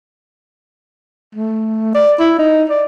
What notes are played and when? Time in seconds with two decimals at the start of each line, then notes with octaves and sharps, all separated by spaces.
1.35 A3
1.95 D5
2.19 E4
2.39 D#4
2.70 D5